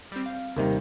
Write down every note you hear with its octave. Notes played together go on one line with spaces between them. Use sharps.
G3 C4
F5
D#2 C3 D#3 G3 A#4